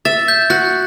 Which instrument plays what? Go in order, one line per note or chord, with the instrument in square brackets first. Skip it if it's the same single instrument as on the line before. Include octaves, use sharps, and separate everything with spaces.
[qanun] E5 [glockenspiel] A6
[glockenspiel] G6
[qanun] F#4 [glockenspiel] F#6